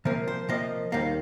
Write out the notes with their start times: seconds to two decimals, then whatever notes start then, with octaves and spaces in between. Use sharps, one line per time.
0.05 C3 F3 A#3 A#4
0.28 C5
0.49 C3 F3 A#3 D#5
0.92 D#2 D#3 G3 A#3